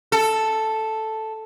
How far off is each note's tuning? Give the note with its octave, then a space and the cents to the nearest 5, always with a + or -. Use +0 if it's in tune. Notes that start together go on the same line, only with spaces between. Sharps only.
A4 +0